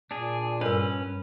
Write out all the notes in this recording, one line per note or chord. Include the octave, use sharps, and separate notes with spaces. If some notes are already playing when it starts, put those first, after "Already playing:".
A#2 D4 G#4
G2 C#4 A#4 B4 C#5